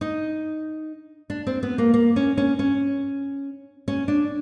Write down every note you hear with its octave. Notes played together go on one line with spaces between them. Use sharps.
D#4
D4
C4
B3
A#3
A#3
C#4
C#4
C#4
C#4
D4